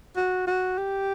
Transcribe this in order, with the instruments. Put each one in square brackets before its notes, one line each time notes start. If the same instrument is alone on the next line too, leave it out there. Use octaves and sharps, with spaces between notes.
[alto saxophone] F#4
F#4
G4